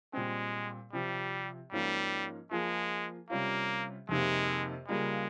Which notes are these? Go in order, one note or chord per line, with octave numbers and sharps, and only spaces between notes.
A#2 G3 G#3 C4
C3 F3 G3 C4
G#2 F3 G3 A#3 C#4
F3 G#3 A#3 F4 G#4
C3 G3 A#3 C#4 F4
F2 C3 D#3 G#3 A#3
C#3 G3 G#3 A#3 F4